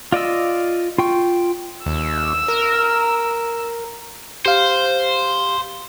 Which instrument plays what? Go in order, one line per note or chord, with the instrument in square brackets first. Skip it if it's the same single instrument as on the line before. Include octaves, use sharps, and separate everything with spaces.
[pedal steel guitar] F4 D5 D#5 E6
F4 G5 C#6
[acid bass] D#2 [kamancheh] E6
[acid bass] A#4
[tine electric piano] G4 F5 [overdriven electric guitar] C5